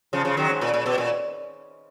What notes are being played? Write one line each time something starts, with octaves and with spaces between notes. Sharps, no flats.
C#3 F3
C#3 F3
D#3 F#3
G#2
A#2
A#2
B2
A#2